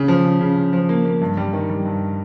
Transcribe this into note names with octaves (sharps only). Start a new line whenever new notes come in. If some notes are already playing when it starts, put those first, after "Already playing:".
Already playing: C#3
F3
C#3
C#3
C#3
F3
A#3
A#3
G2
G3
D#3
G3
G2